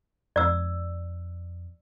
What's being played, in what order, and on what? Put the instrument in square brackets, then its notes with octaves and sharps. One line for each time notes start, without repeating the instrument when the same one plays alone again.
[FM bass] F2 [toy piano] D5 E6